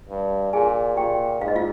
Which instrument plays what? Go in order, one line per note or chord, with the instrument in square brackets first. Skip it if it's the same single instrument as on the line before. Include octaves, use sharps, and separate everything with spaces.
[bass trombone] G2
[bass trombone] A#2 [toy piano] G#4 G#5
[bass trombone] A#2 [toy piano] G4 G5
[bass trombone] G#2 [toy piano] F5
[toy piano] D#5
F4 F5